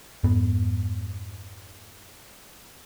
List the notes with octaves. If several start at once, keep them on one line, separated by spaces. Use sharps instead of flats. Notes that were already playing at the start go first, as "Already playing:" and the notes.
F2 G#2 B3